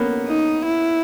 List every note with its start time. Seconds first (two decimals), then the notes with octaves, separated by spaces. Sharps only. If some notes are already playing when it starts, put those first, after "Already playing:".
Already playing: A#3 B3 C#4
0.27 D#4
0.65 E4